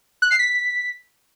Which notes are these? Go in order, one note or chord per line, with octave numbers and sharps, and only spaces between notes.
F#6
C7
B6